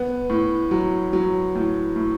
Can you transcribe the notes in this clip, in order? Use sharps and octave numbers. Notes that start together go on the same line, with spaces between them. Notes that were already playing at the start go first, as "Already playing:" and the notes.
Already playing: B3
A2
F#3
F#3
A2
A2